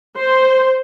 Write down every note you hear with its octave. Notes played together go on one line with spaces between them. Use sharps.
C5